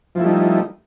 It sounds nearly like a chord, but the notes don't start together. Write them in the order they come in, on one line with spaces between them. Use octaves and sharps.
F3 E4 A3 G3 D#4